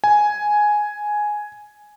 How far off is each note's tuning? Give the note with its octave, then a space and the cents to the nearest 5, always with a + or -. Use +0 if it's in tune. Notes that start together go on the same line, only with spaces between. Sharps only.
G#5 +5